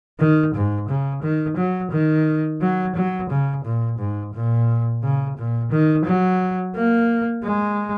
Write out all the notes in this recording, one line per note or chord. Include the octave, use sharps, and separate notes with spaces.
D#3
G#2
C#3
D#3
F#3
D#3
F#3
F#3
C#3
A#2
G#2
A#2
C#3
A#2
D#3
F#3
A#3
G#3